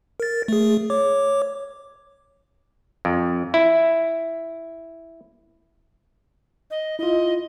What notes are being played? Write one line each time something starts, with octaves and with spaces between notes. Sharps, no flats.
A#4 A6
A3 G#4
C#5 D6
F2
E4
D#5
E4 F4 D#5